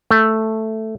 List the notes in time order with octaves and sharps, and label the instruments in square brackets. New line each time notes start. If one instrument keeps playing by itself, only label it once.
[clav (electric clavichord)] A3